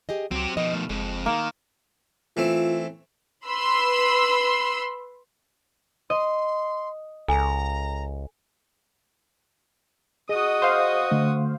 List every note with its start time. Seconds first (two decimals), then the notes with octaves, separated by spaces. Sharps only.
0.09 G4 G#4 D#5
0.31 C#2 F#3 C4 G4
0.57 B2 D#3 F3 D#5
0.74 A3
0.89 F#1 F2 G#3
1.26 D#3 A#3
2.37 E3 A3 C4 F4
3.46 B4 B5 C6 E6
6.10 D#5 C6
7.28 C#2 A4 G#5 A#5
10.29 F#4 G#4 D#5 D#6
10.62 C5 F5
11.11 D3 A3